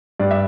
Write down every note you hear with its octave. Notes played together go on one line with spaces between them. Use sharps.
G2 D5
E5